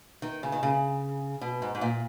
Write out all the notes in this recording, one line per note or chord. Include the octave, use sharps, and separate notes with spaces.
D#3
C#3
D#3
C#3
B2
G#2
G#2
A#2